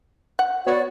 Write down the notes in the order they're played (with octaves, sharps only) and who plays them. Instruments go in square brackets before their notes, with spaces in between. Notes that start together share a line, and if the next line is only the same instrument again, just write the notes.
[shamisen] F#5
[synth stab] B3 C#5 [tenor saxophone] F#4 [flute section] D5